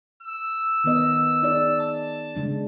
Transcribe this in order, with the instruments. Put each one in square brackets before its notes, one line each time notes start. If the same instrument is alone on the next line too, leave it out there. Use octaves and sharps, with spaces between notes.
[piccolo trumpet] E6
[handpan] D#3 B3 D#5
D#4 G#4 D5
[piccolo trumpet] A5
[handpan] C#3 G#3 D4